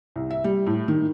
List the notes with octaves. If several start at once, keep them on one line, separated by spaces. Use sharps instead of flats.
C2
E5
G3
A2
D#3